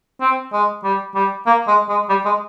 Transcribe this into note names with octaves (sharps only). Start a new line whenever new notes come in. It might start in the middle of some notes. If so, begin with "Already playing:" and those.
C4
G#3
G3
G3
A#3
G#3
G#3
G3
G#3